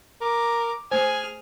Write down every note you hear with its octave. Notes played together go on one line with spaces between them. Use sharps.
A#4 D6
A3 G#4 C5 G#5 F6